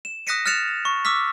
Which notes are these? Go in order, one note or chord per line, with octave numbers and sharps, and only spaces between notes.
E7
D#6 F#6 A#6 B6 C#7 D#7
F6 F#6 A6 C#7 E7 F7
C#6
D6 E6 F6 B6